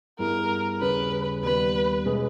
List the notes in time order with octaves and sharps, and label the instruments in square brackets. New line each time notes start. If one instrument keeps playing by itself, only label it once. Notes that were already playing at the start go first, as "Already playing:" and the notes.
[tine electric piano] G2 G3 B3 E4 G#4 [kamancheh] A#4
[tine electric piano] D#2 C#3 G3 C#4 G#4 [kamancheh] B4
[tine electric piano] D#2 D#3 G3 B3 [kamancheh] B4
[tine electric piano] B2 G#3 C#4 G#4 B4